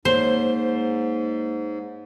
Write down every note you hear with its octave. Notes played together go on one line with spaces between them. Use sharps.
G#2 A#3 C5 C#5